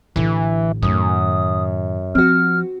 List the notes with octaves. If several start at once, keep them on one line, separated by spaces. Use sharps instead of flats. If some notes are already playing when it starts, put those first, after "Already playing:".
A1 D3 E3
F#2 A2 D#3 D#6
F3 C4 F#4 F6